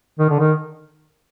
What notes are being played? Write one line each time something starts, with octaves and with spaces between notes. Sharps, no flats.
D#3
D3
D#3